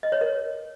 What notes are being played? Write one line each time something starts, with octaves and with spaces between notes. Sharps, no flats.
D#5
C#5
A#4